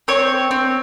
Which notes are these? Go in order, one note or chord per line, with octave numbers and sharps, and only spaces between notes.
C4 C#5
C4